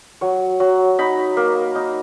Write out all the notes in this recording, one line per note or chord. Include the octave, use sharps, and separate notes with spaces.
F#3 C#5
F#3
D#4 B5
A#3
D#4